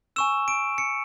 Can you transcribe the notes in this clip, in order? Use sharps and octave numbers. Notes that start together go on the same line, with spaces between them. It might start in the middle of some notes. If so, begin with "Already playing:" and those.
G#5 C#6 E6 E7
D7
C#7